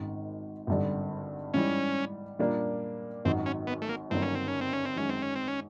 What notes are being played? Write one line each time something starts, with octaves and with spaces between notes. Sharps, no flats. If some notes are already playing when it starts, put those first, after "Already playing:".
Already playing: G#1 G#2 D#3
G#1 G2 D3 G3
G#2 E3 G3 C#4
A#2 G3 A#3 D4
G#1 F#2 D#3 F#3 C4
C#4
B3
A3
A#3
G1 G2 D#3 F#3 A#3 C4
C#4
C4
C#4
C4
C#4
C4
F#2 D#3 G#3 C#4
C4
C#4
C4
C#4